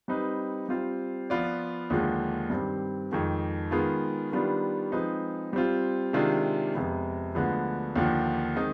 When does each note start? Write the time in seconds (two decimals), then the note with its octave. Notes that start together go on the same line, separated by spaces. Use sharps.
0.08 G3 C4 D#4 B4
0.69 G3 C4 F4 C5
1.30 F3 B3 F4 B4 D5
1.90 D#2 D3 F3 G#3
2.50 G2 D#3 G3 C4
3.12 F2 D#3 G#3
3.71 D#3 G#3 B3 F4
4.32 D#3 G3 B3 D4 F4
4.92 F3 G#3 C4 D#4 B4
5.53 G3 C4 F4
6.13 C3 D#3 G#3 D4 F4
6.74 F2 C3 F3 G#3 B3
7.35 D2 D3 F3 G#3 B3
7.96 D#2 D3 F3
8.56 D#3 G#3 C4 D#4